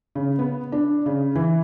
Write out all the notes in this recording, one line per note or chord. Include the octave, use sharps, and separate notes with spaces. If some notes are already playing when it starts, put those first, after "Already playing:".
C#3
B3
D4
C#3
E3